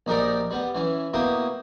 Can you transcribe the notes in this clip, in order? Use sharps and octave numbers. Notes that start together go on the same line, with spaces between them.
A#1 D#4 G4 A#4 D5
G3 B3
E3 C#4
B2 A#3 E4 G4 D#6